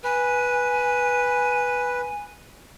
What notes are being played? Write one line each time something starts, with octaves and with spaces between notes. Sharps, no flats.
B4 G#5